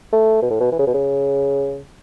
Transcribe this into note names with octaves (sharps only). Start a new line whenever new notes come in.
A3
B2
A2
B2
E3
C#3
B2
C#3